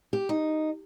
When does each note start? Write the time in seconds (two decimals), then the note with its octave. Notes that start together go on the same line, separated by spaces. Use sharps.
0.13 G4
0.29 D#4